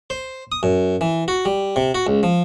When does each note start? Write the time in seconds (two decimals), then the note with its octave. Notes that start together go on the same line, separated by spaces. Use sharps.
0.10 C5
0.52 D#6
0.63 F#2
1.01 E3
1.28 F#4
1.45 G3
1.76 C3
1.94 F#4
2.07 C#2
2.23 F3